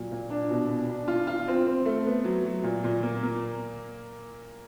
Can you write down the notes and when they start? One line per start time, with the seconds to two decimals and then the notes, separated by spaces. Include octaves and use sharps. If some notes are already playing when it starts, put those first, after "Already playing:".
Already playing: A#2 F#3
0.12 A#2
0.30 D4
0.51 B2
0.69 B2
0.89 D4
1.08 F4
1.27 F4
1.48 C4
1.66 C4
1.86 A3
2.06 B3
2.24 F#3
2.45 F#3
2.63 A#2
2.84 A#2
3.03 A#3
3.23 A#3